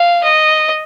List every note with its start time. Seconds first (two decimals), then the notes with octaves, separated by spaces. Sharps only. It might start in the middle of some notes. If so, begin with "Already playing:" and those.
Already playing: F5
0.23 D#5